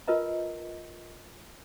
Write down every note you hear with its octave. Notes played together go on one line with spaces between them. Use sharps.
F4 A#4 B4 D#5 A#5